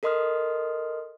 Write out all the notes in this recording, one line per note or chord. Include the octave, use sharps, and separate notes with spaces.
A4 A#4 D#5 C6 D#6 F6